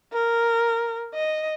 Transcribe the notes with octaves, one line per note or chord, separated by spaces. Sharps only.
A#4
D#5